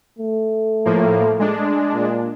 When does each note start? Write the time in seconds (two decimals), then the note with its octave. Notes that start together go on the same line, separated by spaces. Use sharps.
0.18 A3
0.85 A2 F3 A#3
1.39 G#3 D4
1.94 A#2